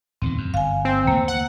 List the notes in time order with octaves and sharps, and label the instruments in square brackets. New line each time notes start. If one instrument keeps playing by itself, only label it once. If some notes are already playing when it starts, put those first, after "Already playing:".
[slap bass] D1 E2 D#3 [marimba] C4
[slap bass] F#2
[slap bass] G1 [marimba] F5 G#5
[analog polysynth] C4
[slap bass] D#2 D3 A3 [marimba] A#3
[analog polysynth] F#5